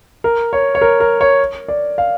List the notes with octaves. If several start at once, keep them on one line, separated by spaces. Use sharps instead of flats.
A#4
C#5
C#5
A#4
A#4
C#5
D5
F5